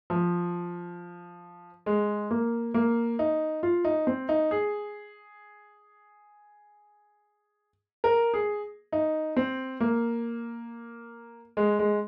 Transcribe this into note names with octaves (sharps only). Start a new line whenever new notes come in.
F3
G#3
A#3
A#3
D#4
F4
D#4
C4
D#4
G#4
A#4
G#4
D#4
C4
A#3
G#3
G#3